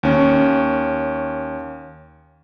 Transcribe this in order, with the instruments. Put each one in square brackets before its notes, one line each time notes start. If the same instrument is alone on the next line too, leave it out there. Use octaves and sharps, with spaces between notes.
[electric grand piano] D#2 C#4